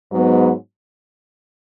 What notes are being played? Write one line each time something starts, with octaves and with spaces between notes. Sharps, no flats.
G#2 F#3 B3